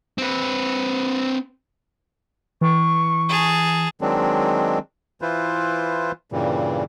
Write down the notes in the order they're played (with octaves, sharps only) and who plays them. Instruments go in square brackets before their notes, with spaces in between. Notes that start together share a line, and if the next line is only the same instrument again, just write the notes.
[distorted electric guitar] C4 B4
[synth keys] E3 [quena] C#6
[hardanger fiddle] G#4 A5
[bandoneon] D#3 F#3 G#3 C4 D4
E3 E4 F4 B4 C5
G2 A#2 C#3 E3 G3